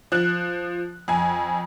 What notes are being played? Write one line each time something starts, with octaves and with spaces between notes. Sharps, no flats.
F3 F#6
F2 G#5